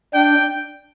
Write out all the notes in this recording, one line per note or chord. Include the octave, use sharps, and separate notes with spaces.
D4 G5